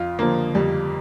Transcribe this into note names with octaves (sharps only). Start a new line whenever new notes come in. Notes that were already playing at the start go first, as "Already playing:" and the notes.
Already playing: F2 F4
D3 F3 A#3
F2 G3